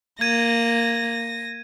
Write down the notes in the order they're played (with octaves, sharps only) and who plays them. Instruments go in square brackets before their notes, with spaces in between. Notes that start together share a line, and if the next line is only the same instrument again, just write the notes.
[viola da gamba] A#3 [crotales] G#6 D#7 [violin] A#6